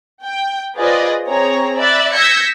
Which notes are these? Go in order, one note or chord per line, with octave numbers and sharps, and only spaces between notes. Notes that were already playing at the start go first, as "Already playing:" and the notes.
G5
F4 G#4 B4 C5 D5 D#5
C4 G#4 C#5 A#5
D5 E5 B5 F#6 A6
E6 G6 G#6 A#6 B6 C#7